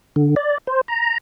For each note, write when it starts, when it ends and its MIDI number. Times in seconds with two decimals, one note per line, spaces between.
0.16 0.35 50
0.36 0.58 74
0.67 0.81 72
0.88 1.18 82